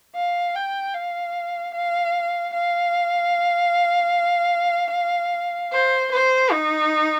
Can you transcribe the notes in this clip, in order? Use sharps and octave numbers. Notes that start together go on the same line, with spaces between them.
F5
G5
F5
F5
F5
C5
C5
D#4